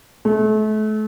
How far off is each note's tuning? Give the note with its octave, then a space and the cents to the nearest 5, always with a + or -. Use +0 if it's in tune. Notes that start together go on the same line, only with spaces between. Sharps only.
A3 -35